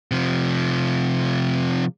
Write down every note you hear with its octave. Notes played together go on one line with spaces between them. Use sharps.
C3 F3